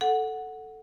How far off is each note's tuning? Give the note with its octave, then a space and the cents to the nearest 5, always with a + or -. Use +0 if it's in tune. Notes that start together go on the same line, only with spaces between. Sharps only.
A4 +0 F#5 -5